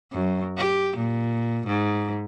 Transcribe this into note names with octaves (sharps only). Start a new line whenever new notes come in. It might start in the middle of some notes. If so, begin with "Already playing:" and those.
F#2
G4
A#2
G#2